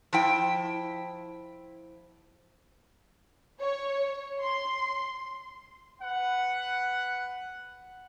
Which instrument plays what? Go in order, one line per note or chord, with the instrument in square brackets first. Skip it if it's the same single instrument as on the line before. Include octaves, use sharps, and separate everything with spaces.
[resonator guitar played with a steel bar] F3 E4 G5
[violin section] C#5
C6
[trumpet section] B4 F#5